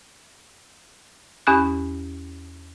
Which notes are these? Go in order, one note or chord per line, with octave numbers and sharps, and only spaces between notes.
E2 C#4 G4 B5 D#6 F#6